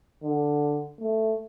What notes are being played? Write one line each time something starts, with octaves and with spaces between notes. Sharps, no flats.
D3
A3